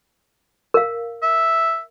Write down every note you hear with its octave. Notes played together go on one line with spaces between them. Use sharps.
A#4 F5
E5